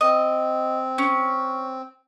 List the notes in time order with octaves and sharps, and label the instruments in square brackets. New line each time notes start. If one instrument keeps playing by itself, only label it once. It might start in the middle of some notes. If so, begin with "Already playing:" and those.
[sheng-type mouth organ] C4 [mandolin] D#5
[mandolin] C#4